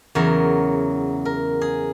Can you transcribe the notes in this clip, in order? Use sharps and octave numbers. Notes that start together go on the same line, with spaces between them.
E2 C#3 F#3 A#4
A#4
G#4